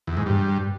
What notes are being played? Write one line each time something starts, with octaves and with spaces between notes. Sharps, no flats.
E2
G#2
G2